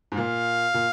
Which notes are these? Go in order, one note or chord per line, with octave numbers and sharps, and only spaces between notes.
G#2
A#2 F5
A#2